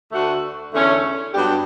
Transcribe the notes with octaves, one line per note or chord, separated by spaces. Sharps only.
D2 D3 A3 D4 F#4
E2 D3 A3 C#4
G2 F#3 B3 D4 G4